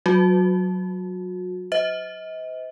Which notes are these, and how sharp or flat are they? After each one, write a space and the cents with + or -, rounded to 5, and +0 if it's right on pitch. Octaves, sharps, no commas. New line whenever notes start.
F#3 +0 F#4 -35
C5 -35 D#5 +40